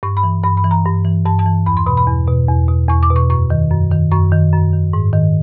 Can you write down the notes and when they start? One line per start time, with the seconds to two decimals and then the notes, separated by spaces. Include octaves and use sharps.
0.03 G2 C#6
0.17 B5
0.23 E3
0.43 G2 B5
0.57 B5
0.64 E3
0.71 A#5
0.85 G2
1.05 E3
1.26 G2 A5
1.39 A5
1.46 E3
1.66 E2 B5
1.77 C6
1.86 B2 B5
1.97 B5
2.07 E2
2.27 B2
2.49 E2
2.68 B2
2.89 E2 C#6
3.03 D6
3.10 B2
3.16 C#6
3.30 F#2 C#6
3.50 D#3
3.71 F#2
3.92 D#3
4.11 F#2 C#6
4.32 D#3
4.52 F#2
4.73 D#3
4.93 G#2
5.13 D#3